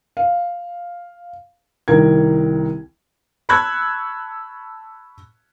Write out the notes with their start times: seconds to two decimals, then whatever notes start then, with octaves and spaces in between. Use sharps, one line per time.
0.17 F5
1.88 C2 D#3 A#4 G#6
3.49 A5 B5 C#6 E6 F#6 G#6